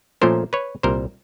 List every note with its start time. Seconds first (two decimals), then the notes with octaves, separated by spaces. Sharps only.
0.21 A#2 F3 A3 C#4 A#4 C5
0.53 B4 C#5
0.83 C2 A#2 G3 A#4 C5